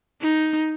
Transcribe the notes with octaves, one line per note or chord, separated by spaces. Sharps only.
D#4